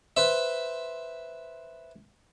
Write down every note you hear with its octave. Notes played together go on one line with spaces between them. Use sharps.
B4 C5 E5